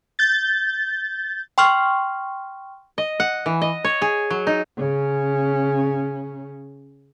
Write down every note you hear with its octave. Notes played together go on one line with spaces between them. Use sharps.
G6 A6
G5 C6 C#6 F6
D#5
F#5
E3
D#5
C#5
G#4
F#3
D#4
C#3 C#4